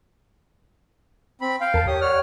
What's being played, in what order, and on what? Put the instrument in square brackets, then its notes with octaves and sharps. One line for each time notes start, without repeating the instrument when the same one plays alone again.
[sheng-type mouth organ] C4 B5
F5 G5
[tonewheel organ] E2 A#4 A5
[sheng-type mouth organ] G4 D#6 [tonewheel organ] C#5
[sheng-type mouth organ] C#5 F6 [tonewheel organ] D5 F#5